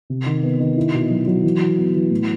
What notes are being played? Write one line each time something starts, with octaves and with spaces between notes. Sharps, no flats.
C3
D#3
B3
D#3
E4
B2
F#3
F#3
E3
E3
B3
E3
A2